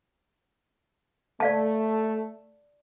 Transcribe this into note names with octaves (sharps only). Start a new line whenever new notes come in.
A3 D5 F5 A5